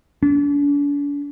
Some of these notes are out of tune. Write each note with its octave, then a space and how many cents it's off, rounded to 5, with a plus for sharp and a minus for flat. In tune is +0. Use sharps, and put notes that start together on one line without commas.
D4 -40